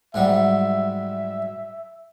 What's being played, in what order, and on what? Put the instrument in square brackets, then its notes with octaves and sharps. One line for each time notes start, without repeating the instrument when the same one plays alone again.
[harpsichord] G#2 F#3 G3 [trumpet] E5